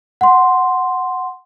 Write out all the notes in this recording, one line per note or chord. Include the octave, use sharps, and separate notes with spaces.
F#5 C6